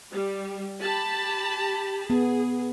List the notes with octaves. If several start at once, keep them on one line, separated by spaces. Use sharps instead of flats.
G3
G4 A5 B5
B3 G#4